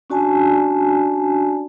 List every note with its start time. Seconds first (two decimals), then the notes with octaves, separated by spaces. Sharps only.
0.10 C#4 D4 F#4 D5 G#5 A5